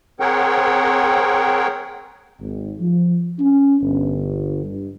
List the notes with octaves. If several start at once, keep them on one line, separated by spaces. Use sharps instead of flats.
C4 G#4 A#4 C#5 F#5 G5
G#1
F3
C#4
G1
G2